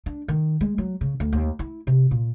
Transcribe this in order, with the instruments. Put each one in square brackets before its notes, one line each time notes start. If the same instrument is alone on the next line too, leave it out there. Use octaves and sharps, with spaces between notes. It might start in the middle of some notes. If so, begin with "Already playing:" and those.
[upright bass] D4
D#3
G#3
F#3
C#3
D2
D#2
E4
C3
A#2